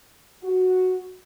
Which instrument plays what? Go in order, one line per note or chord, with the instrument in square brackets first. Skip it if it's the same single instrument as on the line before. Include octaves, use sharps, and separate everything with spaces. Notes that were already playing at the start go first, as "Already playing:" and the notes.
[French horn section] F#4